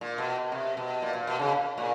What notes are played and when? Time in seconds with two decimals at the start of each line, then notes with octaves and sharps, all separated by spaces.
0.01 A#2
0.18 B2
0.52 C3
0.77 B2
1.02 A#2
1.15 A#2
1.27 B2
1.39 C#3
1.78 A#2